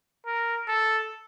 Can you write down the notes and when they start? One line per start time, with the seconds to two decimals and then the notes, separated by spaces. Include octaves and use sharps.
0.26 A#4
0.68 A4